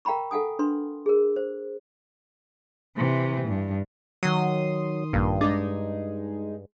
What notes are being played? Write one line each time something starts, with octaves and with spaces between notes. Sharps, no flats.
A#4 F5 G5 A#5 B5 C#6
A4 F5 F#5 G#5 D#6
D4 B4 C6
G#4 A#4
C5
C3 E3
G2
D#3 F#3 C6 D#6
A#1 G2 A#2
G#3 D4 D#4 G#4